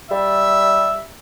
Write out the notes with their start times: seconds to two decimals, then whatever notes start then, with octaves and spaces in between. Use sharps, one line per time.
0.11 G3 E5